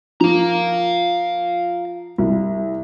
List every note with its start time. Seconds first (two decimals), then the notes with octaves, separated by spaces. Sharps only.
0.21 F3 F5 A#5
2.18 C2